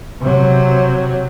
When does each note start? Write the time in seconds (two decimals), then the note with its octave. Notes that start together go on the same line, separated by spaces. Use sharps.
0.21 C3 F#3